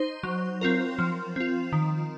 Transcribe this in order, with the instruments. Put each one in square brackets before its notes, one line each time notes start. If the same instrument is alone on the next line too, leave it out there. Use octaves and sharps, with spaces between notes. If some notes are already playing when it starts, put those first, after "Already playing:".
Already playing: [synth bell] D#4 C5
F#3
C4 F4 A#4
F3
C4 F4
D#3